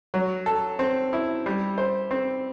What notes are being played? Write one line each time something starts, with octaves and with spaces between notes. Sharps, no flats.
F#3
A4
C4
E4
G3
C5
C4